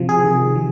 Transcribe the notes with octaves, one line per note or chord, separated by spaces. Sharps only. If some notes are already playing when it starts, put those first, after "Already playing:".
Already playing: C3 F3
G#4
C3 D#3
F3